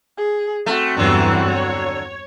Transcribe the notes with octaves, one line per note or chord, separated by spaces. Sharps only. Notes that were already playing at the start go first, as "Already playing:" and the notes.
G#4
A3 C4 F#4
E2 G2 D3 E3 F#3
C#5